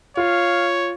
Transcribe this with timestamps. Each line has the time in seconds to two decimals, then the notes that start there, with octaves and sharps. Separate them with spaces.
0.17 F4 C#5 F5